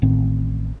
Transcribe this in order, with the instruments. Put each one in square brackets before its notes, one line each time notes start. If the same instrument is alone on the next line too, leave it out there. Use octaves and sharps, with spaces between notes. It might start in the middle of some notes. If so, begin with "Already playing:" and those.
[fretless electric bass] A1 A2 D#3 C4